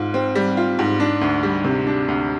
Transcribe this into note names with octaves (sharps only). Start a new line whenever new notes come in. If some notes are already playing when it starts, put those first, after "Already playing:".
Already playing: G#2 F4
C4
G3
F4
G#2
D4
D2
G3
C3
D4
D2